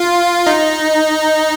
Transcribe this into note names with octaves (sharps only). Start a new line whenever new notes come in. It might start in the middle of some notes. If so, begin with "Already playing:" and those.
Already playing: F4
D#4